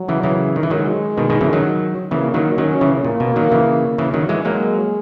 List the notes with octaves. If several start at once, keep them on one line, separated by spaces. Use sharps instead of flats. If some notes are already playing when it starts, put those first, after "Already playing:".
Already playing: F#3
C#3 E3
C#3 E3
D#3
E3
D#3 F#3 G#3
B2 D#3
B2 D#3
C#3 E3
D#3 F#3
C#3 E3 A#3
D#3 F#3
D#3 F#3 C#4
C#3 E3
A#2 A#3
B2
D#3 F#3
C#3 E3
C#3 E3
D#3 F#3
E3 G#3
F#3 G#3 A#3